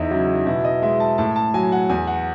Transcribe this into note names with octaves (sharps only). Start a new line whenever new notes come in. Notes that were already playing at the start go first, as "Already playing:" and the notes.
Already playing: E2 D#4 E4
C#3 F#3 E4
D#4
B2 E4
D#5
G#3 E5
A5
A2 A5
A5
F#3 G#5
F#5
E2 G#5
F#5